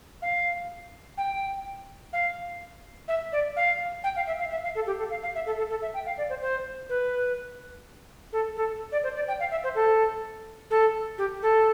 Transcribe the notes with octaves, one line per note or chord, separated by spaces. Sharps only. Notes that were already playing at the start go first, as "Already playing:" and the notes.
F5
G5
F5
E5
D5
F5
G5
F5
E5
F5
E5
F5
A4
G4
A4
F5
F5
E5
A4
A4
A4
E5
G5
F5
D5
C5
C5
B4
A4
A4
D5
C5
D5
G5
F5
E5
C5
A4
A4
G4
A4